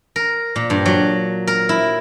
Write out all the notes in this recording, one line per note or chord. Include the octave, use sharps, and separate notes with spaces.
A#4
A#2
G2
F#3
A#4
E4